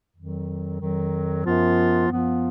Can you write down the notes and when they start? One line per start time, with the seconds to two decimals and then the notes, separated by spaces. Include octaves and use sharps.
0.16 F2 D#3 F#3
0.80 F2 D#3 F#3
1.44 F#2 F3 B3 F4
2.09 F#2 F3 B3 F4